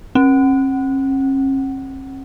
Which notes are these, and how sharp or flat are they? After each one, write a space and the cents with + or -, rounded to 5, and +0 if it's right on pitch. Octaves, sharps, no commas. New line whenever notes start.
C#4 -45